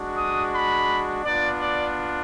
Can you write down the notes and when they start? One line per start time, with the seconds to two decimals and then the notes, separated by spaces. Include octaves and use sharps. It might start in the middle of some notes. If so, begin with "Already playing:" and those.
Already playing: G#3 D4 F#4
0.16 D#6
0.52 B5
1.25 B3 D4 F4 D5
1.61 D5